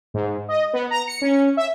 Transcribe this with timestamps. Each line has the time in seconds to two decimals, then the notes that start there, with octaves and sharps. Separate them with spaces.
0.14 G#2
0.48 D#5
0.73 B3
0.91 A#5
1.07 C#7
1.22 C#4
1.57 E5